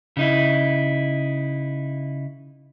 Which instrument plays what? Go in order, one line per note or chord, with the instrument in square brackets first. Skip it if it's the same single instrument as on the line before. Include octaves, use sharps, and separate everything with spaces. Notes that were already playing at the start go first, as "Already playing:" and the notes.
[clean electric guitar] C#3 D#4 E4